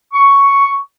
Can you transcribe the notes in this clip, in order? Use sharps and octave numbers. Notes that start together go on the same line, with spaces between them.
C#6